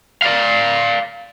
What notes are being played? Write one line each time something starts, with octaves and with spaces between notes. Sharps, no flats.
D5 F5